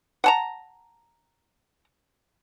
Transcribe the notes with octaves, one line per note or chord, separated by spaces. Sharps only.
F#5 A5 A#5